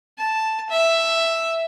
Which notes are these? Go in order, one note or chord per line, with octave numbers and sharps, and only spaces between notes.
A5
E5